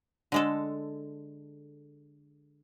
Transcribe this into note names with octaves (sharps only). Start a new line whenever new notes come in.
D3 G#3 A4